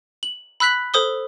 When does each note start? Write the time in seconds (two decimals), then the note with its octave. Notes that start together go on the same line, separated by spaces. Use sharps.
0.23 F#7
0.60 B5 E6 F#6 B6 F#7
0.94 A4 C5 D#6 G7